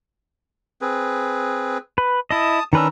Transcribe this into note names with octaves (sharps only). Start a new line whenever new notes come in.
C4 G#4 B4
B4
E4 D#5 A5 D#6
D#3 C#4 D4 B4 A#5 E6